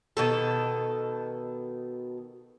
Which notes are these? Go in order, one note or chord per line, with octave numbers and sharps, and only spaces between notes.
B2 D#3 A4